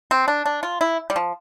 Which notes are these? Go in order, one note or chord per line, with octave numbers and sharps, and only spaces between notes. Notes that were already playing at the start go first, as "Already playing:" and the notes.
C4
D4
D4
F4
E4
G3
F3